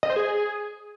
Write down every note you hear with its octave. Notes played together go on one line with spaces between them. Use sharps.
D#5
C5
G#4